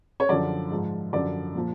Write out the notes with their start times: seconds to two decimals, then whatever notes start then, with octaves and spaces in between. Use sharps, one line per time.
0.20 C#5
0.29 F#2 D3 F3 D5
0.71 G#2 F3
1.13 F#2 D3 F3 D5
1.55 A#2 F3